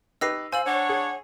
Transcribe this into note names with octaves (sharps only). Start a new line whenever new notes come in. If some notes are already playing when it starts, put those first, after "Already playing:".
D#4 G4 B4 E6 A#6 C7
C5 F5 G#5 E6 F#7
D4 C#5 F#5
G#4